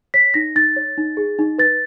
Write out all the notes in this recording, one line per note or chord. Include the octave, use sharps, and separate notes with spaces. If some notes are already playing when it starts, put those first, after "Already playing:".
C#5 B6
D#4 A#6
D#4 A6
C#5
D#4
G#4
D#4
B4 A6